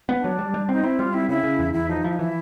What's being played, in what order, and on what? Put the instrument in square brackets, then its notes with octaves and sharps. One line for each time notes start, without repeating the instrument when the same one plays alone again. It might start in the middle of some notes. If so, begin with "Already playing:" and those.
[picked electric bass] B3
[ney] D4
[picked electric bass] F#3
G3
G3
[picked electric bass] C4 [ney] D#4
[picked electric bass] C4 [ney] E4
[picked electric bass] G3 [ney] F4
[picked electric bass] C4 [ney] E4
[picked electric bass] C#3 [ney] E4
[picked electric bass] C#3
E2
[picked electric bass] E2 [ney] E4
[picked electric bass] F3 [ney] D#4
[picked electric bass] F3 [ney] E4
[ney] D#4
[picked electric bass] E3 [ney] E4